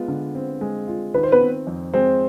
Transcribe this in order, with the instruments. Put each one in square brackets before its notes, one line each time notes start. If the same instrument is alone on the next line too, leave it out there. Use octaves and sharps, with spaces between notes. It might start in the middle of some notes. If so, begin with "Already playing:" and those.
Already playing: [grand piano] G#3 F4 [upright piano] B3
[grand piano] D3
C4
G#3
F4
[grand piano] D#3 [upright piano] B4
[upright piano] C5
B3 B4
[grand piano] C4
F2
[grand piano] G#3 [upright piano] C4 C5